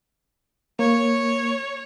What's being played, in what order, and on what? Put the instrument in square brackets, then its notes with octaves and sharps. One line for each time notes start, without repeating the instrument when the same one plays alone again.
[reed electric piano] A#3 [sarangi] C#5